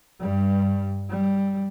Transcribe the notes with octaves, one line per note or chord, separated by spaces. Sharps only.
G2 G3
G3